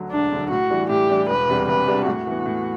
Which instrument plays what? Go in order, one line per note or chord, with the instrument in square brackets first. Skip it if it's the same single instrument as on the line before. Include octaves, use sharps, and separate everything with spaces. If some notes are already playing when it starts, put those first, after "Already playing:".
Already playing: [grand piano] D2 D3 F#3
[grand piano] E1 [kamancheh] D4
[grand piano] D2 D3 F#3
[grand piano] A2 [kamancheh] F#4
[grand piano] E3 G3 D4
[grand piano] A2 [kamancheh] G4
[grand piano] E3 G3 D4
[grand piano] E1 [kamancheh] B4
[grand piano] E2 C3 G3 D4
[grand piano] E1 [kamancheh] B4
[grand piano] E2 C3 G3 D4
[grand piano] A2 [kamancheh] F#4
[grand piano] E3 B3
A2